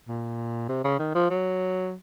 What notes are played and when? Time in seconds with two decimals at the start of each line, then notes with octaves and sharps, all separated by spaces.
0.08 A#2
0.69 C3
0.84 C#3
0.99 D#3
1.15 F3
1.30 F#3